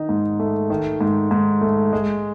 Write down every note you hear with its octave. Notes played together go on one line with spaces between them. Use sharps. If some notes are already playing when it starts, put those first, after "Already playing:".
Already playing: D#3 D#4
G#2
A3
D#3
G#2
G#2
A3
G#3